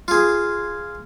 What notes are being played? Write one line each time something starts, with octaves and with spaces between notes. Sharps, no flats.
F4 G#4